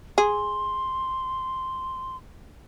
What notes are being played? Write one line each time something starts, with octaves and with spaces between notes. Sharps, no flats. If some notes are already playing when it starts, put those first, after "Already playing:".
G#4 C6